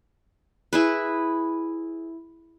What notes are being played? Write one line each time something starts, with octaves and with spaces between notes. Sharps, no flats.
E4 G#4 B4